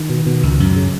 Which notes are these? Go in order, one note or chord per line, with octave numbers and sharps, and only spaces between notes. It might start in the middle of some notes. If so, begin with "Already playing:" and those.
Already playing: D#3
B2
B2
C#2
F#2
C#3